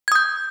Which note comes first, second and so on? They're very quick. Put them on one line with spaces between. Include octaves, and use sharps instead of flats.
G#6 D#6 G6